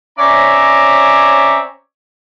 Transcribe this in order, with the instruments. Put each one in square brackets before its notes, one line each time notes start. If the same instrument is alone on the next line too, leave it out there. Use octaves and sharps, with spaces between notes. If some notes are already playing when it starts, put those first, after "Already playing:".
[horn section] C4 C#4 C#5 D5 E5 A#5